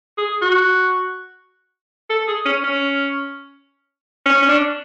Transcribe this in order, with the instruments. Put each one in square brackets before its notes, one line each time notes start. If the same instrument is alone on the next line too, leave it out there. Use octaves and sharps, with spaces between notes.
[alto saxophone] G#4
F#4
A4
G#4
C#4
C#4
C#4
C#4
D4